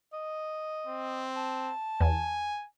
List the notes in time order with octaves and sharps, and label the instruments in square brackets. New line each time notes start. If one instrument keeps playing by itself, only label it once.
[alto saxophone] D#5
[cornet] C4
[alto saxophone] A5
[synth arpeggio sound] E2 [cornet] G#5